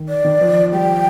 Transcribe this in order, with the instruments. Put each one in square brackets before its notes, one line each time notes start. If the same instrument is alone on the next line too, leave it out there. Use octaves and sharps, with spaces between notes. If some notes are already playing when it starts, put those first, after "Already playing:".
Already playing: [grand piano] D#3
[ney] D5
[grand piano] D#3
F3
[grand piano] G3 [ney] G5